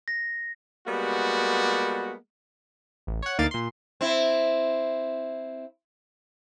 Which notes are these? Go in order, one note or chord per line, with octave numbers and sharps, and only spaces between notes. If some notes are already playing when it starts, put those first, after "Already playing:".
A#6
G3 G#3 A#3 B3 F#4
A1
C#5 F#5
D2 A#3 D#4 F5 D6 A6
A#2 C6
C4 E4